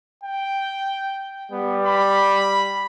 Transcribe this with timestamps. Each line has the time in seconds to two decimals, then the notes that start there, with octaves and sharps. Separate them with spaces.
0.24 G5
1.52 G3 B3
1.87 B5